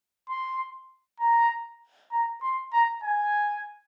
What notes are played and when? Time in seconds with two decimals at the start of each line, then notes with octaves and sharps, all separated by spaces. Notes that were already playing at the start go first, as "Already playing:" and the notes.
0.29 C6
1.20 A#5
2.12 A#5
2.42 C6
2.73 A#5
3.03 G#5